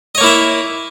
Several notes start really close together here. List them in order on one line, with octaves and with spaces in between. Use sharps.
D#5 C#5 A#3 E4 E5